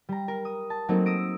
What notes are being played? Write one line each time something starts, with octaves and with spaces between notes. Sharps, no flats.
G3 A#5
A#4
D#6
A5
F#3 A3 A#3 C4 D#4
D#6 E6 A#6 D7